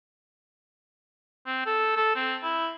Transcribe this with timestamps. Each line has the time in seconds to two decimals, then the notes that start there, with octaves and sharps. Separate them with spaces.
1.47 C4
1.66 A4
1.96 A4
2.16 C4
2.43 E4